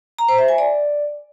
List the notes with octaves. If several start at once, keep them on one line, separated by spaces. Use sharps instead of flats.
A#5
C5
E5
G#5
D5